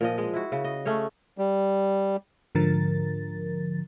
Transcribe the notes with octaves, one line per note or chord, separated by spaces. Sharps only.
A#2 F3 D#5
G#3 G#4
E4 F#4
C#3
D#5
A3 C#4 G#4 C#5
G3
G#2 D3 F3 A#4 A6